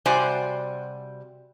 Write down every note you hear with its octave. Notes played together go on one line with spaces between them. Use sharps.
C3 G3 F#4 C5 D5 G#5